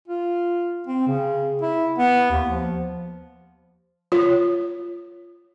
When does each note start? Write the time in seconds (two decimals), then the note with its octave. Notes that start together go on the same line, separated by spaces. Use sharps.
0.08 F4
0.87 C4
1.07 C#3
1.61 E4
1.99 B3
2.31 D#2
2.49 F3
4.12 F4 C#5